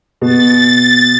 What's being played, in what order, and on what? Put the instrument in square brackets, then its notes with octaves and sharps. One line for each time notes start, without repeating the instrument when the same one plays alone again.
[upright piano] B2 [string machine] A6